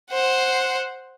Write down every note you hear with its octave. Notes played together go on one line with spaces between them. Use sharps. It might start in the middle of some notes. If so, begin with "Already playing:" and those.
C5 F#5